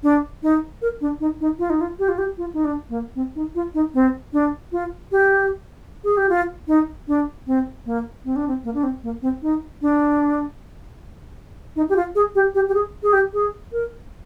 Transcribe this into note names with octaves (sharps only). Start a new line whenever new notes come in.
D4
D#4
A#4
D4
D#4
D#4
F4
D#4
F4
G4
F4
G4
F4
D#4
D4
A#3
C4
D#4
F4
D#4
C4
D4
F4
G4
G#4
G4
F4
D#4
D4
C4
A#3
C4
D4
C4
A#3
D4
C4
A#3
C4
D#4
D4
D#4
G4
F4
G#4
G4
G4
G4
G#4
G#4
G4
G#4
A#4